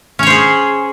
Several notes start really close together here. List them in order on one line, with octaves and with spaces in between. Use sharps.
C#4 C#5 C5 G#4